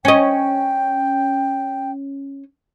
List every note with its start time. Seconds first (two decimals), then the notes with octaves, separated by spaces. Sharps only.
0.05 C#4 D#5 G5